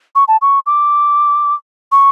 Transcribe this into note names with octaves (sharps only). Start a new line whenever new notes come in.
C#6
A5
C#6
D6
C#6